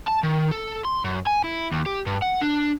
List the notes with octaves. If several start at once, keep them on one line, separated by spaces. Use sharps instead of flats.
A5
D#3
A4
C6
F#2
G#5
E4
D#2
G4
G2
F#5
D4